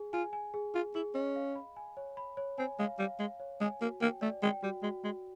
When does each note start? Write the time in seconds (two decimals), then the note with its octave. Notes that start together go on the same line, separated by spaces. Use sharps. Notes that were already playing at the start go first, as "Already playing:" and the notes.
Already playing: G#4 G#5
0.13 F4 G#5
0.33 G#5
0.54 G#4
0.74 F4 G#4
0.95 E4 G#4
1.15 C#4 D#5
1.36 F5
1.55 B5
1.76 G#5
1.97 C#5
2.17 B5
2.37 C#5
2.58 C4 G#5
2.79 G#3 F5
2.99 G3 F5
3.19 G#3 F5
3.40 C#5
3.61 G#3 G#5
3.81 A#3 F#4
4.01 A#3 G5
4.21 A3 D5
4.42 G#3 G5
4.63 G3 F#4
4.82 G#3 F#4
5.04 G#3 F#4